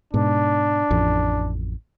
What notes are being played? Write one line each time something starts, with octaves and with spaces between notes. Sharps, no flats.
G#2 B2 D4
A1 F2